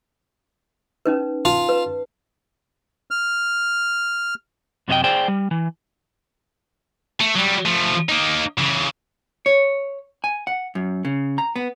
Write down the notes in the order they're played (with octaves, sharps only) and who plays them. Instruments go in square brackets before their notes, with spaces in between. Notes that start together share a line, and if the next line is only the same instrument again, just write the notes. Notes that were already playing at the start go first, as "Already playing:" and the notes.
[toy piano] C#4 D#4 B4
[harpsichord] F4 F5 [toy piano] A5
[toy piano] B4
[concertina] F6
[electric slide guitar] F#2 C3 C#4 F4 D#5 G5
G#4 C5 D5 G5
G3
E3
[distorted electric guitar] A3
F#3 G3
F3 A3
A#3 D#4
C#3 E3
[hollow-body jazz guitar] C#5
G#5
F#5
F#2
C#3
A#5
B3